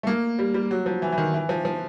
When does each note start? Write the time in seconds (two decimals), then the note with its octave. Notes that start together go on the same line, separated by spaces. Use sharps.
0.03 A3
0.07 A#3
0.39 G3
0.54 G3
0.71 F#3
0.86 F3
1.02 E3
1.12 E3
1.18 D#3
1.34 E3
1.49 F3
1.65 F3